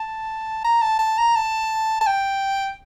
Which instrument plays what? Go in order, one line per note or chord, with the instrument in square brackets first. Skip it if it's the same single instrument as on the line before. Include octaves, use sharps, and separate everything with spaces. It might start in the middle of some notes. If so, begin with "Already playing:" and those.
Already playing: [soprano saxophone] A5
A#5
A5
A5
A#5
A5
A5
G5